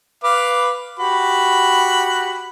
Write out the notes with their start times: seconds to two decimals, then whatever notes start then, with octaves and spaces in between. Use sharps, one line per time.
0.24 B4 F5 D6
0.99 F#4 G4 B5